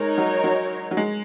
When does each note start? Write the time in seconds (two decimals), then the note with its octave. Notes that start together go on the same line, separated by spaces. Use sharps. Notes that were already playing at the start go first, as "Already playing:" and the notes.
Already playing: G#3 D#4 A#4 C#5
0.18 F#3
0.44 F#3
0.91 F#3
0.97 G#3